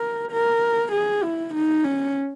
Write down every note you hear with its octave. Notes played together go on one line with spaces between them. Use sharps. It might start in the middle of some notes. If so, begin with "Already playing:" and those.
Already playing: A#4
A#4
G#4
E4
D#4
C#4